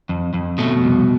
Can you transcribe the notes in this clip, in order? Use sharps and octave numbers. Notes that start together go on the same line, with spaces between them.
F2
F2
B2 A3
C2